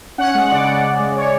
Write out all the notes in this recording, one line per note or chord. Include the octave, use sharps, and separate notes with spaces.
C#4 F#5
G#3
C#3 D5
C#3
C#4
G#3
C#5